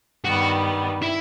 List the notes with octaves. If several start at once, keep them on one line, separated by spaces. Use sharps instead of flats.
G2 D#3 G3 B3 F#4
E4